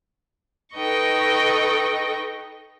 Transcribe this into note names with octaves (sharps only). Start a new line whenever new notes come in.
D#4 A4 B4 D#5 G5 C#6